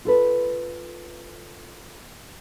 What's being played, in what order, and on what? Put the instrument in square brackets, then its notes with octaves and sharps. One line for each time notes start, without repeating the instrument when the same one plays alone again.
[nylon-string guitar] F4 A4 B4